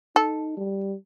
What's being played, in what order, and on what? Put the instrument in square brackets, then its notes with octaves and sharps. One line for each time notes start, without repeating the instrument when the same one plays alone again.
[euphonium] D#4 [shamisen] A4
[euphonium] G3